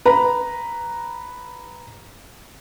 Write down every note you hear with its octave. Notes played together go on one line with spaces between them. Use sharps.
B4 A#5